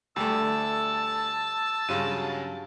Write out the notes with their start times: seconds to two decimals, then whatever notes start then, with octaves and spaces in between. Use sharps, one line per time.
0.16 D2 G3 A3 A5 E6
1.89 G2 C#3 F#3 F4 D#7